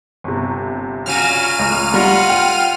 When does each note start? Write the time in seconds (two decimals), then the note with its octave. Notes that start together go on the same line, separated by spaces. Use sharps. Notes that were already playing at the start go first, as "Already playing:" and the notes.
0.24 G1 C3
1.06 A#2 C#3 F#3 F6 D#7
1.59 C#2 A2
1.94 G3 F4 A#4 F#5
2.30 G5